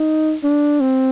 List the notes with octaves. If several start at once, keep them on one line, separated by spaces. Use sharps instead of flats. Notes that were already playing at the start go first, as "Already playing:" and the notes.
Already playing: D#4
D4
C4